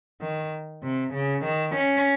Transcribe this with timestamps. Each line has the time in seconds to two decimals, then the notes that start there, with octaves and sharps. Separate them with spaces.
0.21 D#3
0.83 C3
1.14 C#3
1.45 D#3
1.75 C#4